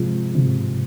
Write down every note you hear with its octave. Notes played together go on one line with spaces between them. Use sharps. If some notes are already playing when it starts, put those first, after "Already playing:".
Already playing: C3 F3 G#3
C3